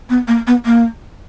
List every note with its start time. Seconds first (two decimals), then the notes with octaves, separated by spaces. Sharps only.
0.10 B3
0.28 A#3
0.47 B3
0.66 A#3